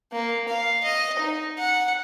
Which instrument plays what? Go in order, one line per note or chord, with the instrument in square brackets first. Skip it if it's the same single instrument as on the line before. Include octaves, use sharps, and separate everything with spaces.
[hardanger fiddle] A#3
F5
D#5
D#4
F#5